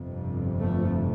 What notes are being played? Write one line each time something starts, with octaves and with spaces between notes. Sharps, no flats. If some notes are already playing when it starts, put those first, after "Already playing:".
Already playing: G1 F2 C3
F3 A3